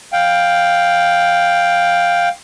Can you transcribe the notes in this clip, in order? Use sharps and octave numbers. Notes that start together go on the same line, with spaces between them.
F5 G5